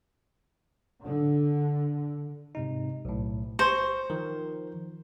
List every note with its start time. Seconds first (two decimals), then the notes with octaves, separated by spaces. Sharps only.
1.02 D3
2.55 G#2 C3 D#4
3.05 B1 A2
3.59 C5 C#6
4.10 D#3 F3 A#4